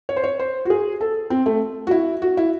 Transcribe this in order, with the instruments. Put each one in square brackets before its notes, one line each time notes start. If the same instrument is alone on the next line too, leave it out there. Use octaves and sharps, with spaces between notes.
[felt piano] C#5
C5
C#5
C5
F#4
G#4
A4
C4
A3
F#4
E4
F#4
E4